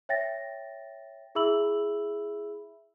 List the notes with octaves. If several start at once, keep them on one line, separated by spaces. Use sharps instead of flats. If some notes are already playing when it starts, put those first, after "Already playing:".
C#5 E5 G5 A6 A#6
E4 G#4 E5 B5 E6 F#7